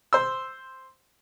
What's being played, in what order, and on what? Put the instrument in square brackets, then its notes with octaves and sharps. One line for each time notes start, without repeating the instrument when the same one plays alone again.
[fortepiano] C5 C6 E6